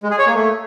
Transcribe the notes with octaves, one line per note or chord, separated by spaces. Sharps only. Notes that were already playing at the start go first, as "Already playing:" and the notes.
G#3
G#4
C#5
A#3
A3